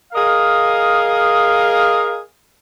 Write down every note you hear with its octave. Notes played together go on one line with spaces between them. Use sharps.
G#4 A#4 D#5 F5